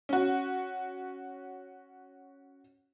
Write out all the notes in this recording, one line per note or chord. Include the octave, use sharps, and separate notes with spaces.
C#4 F#4